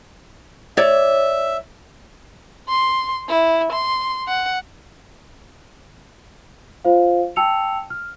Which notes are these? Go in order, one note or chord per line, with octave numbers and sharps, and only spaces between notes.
C#5 D5 E5
C6
E4
C6
F#5
F4 C5 F5
G5 A5 E6 C#7 F7
F6